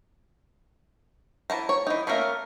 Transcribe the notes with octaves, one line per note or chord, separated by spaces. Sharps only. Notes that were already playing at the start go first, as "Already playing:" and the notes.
E3 A5 A#5
C#5
E3 D#4
A3 A#3 C#4 A#4 E5